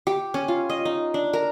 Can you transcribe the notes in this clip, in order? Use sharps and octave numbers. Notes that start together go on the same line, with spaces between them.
G4
C#4
F4
D#5
D#4
D4
A#4